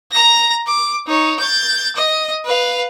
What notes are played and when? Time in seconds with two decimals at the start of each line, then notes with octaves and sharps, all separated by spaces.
0.12 A#5 A#6
0.67 D6
1.07 D#4 C#5
1.39 G6 A6
1.96 D#5
2.45 B4 F5